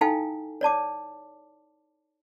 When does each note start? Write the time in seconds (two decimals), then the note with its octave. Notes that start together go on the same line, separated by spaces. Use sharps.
0.01 D#4 E4 A4 F5 G5 G#5
0.61 C#5 D5 A5 D6